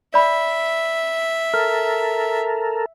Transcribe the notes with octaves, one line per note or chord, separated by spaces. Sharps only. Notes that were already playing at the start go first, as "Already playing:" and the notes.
D5 E5 B5
A4 A#4 F6